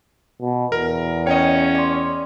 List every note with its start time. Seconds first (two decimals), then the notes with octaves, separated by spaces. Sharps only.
0.41 B2
0.72 E2 A#4
1.27 C#4 C#5 D#5 G5 C#7
1.75 D5 C6